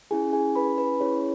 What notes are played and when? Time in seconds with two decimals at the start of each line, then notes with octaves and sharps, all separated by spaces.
0.11 C#4 E4 G#4 G#5
0.33 G#4 G#5
0.56 B4 B5
0.78 B4 B5
1.00 C#4 E4 G#4 C#5